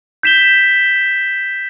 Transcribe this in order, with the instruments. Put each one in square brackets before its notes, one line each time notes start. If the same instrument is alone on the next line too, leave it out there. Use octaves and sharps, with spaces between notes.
[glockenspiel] G6 B6 E7 G7